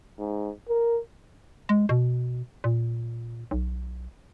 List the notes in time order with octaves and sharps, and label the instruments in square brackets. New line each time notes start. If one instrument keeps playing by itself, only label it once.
[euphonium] G#2
A#4
[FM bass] G#3
B2
A#2
B1